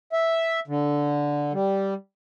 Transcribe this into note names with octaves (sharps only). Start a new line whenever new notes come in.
E5
D3
G3